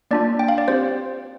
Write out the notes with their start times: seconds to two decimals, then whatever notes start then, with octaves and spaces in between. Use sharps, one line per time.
0.11 A#3 D4 F4 D5
0.39 G5
0.48 F5
0.58 D5
0.68 C4 G4 C5